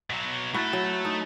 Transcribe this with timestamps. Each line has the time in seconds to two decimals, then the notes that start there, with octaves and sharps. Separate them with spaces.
0.10 B2 F#3
0.54 A3 E4 F#4 A5
0.73 F#3
1.05 D#4